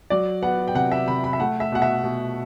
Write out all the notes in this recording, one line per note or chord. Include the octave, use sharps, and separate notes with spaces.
F#3 D5
B3 F#5
G5
C3 F#5
E5
C3 B5
B5
E5
A3 F#5
E5
B2 F#5
E5
B2